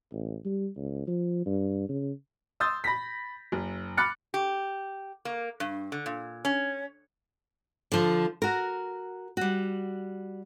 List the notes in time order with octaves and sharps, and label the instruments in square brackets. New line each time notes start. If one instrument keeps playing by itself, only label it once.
[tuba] A1
G3
C#2
F3
G2
C#3
[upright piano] C6 D#6 E6 G6 A6
B5 A#6 B6
F#1
B5 D6 F6 F#6 A6 C#7
[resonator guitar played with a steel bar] G4
A#3
G2
D3
A#2
C#4
[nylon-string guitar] D3 F3
F#4 A#4
G3 F#4